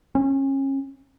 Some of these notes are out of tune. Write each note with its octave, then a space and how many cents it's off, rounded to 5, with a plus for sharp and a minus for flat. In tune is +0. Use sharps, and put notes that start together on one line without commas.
C#4 -30